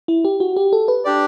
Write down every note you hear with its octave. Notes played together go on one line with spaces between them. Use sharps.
E4
G4
F#4
G4
A4
B4
D4 G4 D5